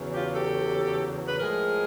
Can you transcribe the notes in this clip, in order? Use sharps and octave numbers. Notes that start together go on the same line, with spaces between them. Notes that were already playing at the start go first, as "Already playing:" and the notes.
Already playing: E2 C#3 F#3
F4 G4
G4 A4
B4
A2 F3 G#3 G#4 A#4